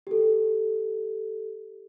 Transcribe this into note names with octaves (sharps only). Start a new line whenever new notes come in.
G4 A4